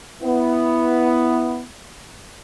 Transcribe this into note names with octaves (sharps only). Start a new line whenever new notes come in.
B3 E4